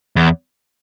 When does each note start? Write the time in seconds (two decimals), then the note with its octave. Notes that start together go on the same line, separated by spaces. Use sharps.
0.16 E2